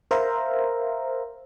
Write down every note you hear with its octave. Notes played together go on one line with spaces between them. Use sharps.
A#4 C5 E5 F5 A#5